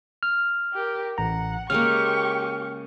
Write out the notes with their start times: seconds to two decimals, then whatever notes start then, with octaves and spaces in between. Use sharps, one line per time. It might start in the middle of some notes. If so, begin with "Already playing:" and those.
0.23 F6
0.74 G4 A#4
1.18 A1 F#5 A#5
1.70 C#3 G#3 A#3 G4 C#6 F6